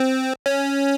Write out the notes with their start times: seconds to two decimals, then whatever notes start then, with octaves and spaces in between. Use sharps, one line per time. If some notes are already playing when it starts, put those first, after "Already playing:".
Already playing: C4
0.46 C#4